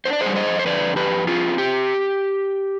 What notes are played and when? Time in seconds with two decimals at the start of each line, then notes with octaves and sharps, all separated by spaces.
0.05 D4 C5
0.13 D5
0.21 G3 G#4 C5
0.36 C5 D#5
0.46 F2
0.59 C5
0.66 D3 B4 D5
0.86 F2
0.96 G4 B4
1.07 F2
1.27 C4 F4 G#4
1.48 C4
1.58 G4